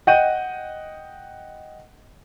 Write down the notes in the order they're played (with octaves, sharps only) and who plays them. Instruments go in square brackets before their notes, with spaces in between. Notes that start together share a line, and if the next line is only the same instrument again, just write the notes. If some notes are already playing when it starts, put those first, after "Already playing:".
[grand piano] D#5 F#5 G5 G6 D#7